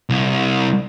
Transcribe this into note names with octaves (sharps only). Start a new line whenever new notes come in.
C2